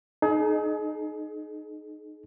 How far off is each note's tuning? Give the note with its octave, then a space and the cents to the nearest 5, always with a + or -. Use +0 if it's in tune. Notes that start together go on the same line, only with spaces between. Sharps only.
D#4 -15 G#4 +35